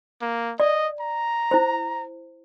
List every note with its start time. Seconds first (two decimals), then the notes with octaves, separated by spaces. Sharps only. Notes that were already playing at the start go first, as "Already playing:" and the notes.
0.21 A#3
0.60 D5 D#5
1.00 A#5
1.51 E4 C5